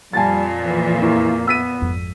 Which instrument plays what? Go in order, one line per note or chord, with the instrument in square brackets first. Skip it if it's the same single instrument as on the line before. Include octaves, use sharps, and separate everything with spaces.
[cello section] F2 A#2 [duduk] G3 [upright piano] G#5 A5 A6
[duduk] E3
[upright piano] E2 [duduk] A#3
[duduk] B3 [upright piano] E6 B6 D#7
[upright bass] G#1 F2